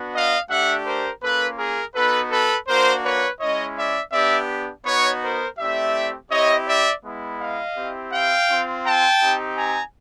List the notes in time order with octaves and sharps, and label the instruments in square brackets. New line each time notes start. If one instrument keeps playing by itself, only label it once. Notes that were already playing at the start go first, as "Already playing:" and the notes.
Already playing: [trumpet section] B3 D4 F#4
D#5 F5
A3 D4 G4 E5 F#5
A#4 C5
A#3 C#4 F4 A4 B4
G#4 A#4
B3 D#4 F#4 A4 B4
A4 B4
A#3 D4 F#4 A#4 C5
B4 C#5
G#3 C#4 E4 C#5 D#5
D5 E5
B3 D4 G4 D5 E5
B3 D#4 F#4 B4 C#5
A#4 C5
A3 C4 E4 G4 D5 E5
C4 E4 G4 C#5 D#5
D5 E5
G#3 B3 E4
D#5 F5
C4 E4 G4
F5 G5
C4 F4
G5 A5
C4 D#4 G4
G#5 A#5